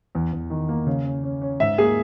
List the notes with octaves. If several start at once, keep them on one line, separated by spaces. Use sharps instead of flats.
E2
E2
D#3
A#3
C#3
C#4
C#4
C#4
G#2 E5
A#3 G#4